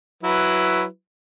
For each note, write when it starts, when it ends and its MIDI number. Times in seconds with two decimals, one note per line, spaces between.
0.23 0.84 54
0.23 0.84 64
0.23 0.84 71